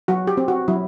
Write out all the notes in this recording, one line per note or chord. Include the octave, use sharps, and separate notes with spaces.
F#3 F#4
G4
C4
F#4
F#3 E4